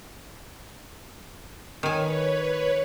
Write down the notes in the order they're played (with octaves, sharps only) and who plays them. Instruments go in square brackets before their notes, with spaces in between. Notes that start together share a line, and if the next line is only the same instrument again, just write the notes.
[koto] D#3 G#5 [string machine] B4 C#5